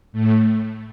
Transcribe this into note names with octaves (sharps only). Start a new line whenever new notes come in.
A2 A3